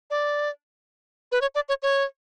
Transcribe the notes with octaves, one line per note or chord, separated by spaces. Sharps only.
D5
B4
C#5
D5
C#5
C#5